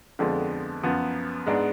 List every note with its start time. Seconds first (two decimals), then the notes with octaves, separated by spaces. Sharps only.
0.19 F2 D3 F3 G#3 B3
0.83 F#2 F3 B3
1.46 G#2 G#3 B3 D4